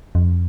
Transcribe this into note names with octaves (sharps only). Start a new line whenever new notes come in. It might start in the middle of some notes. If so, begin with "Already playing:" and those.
F2